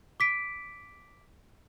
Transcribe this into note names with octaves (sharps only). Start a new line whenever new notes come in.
D6 B6 D7